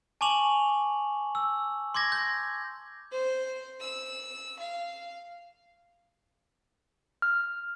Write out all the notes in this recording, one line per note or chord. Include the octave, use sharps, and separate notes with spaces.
G#5 A5 C#6 D6 F7 F#7
E6
C6 D6 G#6 A#6
G6
C5
E6
F5
F6